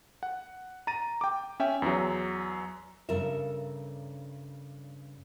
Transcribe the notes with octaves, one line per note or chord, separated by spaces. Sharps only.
F#5
A#5 A6 D#7
G5 D6
C#4 E5 G5
E2 F#3
G2 C#3 A4 A#4 E5